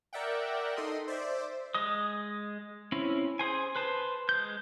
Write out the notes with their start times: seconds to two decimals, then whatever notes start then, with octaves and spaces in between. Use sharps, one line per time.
0.13 A#4 D5 E5 F#5 G5
0.76 D#4 A4 D#5 C6 D#6
1.08 C5 D5 E5
1.75 G#3 D#5 D#6
2.92 C4 C#4 E4
3.39 G#4 C5 G#5
3.76 B4 C5 A5
4.29 G#3 G6